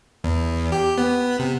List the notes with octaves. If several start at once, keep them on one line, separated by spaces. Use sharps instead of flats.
E2
G4
B3
C3